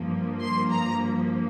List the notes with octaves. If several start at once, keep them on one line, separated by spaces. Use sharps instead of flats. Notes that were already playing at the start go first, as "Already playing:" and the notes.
Already playing: G2 F3 A#3
C6
A#5